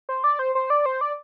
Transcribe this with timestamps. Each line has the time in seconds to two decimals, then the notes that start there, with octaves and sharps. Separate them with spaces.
0.09 C5
0.24 D5
0.39 C5
0.55 C5
0.70 D5
0.86 C5
1.01 D5